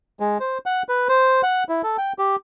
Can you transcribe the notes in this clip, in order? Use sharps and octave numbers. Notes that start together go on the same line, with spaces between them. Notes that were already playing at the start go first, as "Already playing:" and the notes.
G#3
C5
F#5
B4
C5
F#5
E4
A4
G5
G4